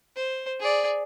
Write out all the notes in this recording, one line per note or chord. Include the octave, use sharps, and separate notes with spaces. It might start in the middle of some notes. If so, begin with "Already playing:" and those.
C5
G#4 D5